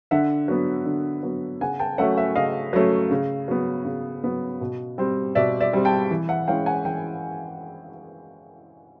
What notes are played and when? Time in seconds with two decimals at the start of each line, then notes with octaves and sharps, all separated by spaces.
0.11 D3 E5 F#5
0.48 F#3 B3
0.85 D3
1.23 F#3 B3
1.61 C#3 F#5 G#5
1.79 G5 A5
1.98 F#3 A3 C#4 E5 F#5
2.17 E5 F#5
2.35 C#3 D#5 F5
2.73 F#3 A3 C#4
3.11 C#3
3.48 F#3 B3
3.85 C#3
4.24 F#3 B3
4.61 B2
4.98 G3 C4
5.35 B2 D5 E5
5.60 D5 E5
5.73 G3 C4
5.85 G5 A5
6.11 E3
6.29 E5 F#5
6.48 G#3 C#4 E4 F5 G5
6.66 F#5 G#5
6.85 E3 G5